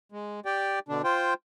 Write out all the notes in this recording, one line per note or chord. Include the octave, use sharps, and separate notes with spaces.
G#3
G4 D5 G5
B2 D3 D4
F4 C5 G5